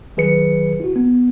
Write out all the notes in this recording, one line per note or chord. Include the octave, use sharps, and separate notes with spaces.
D#3 F#3 G#4 B4 C#7
E4 F#4
B3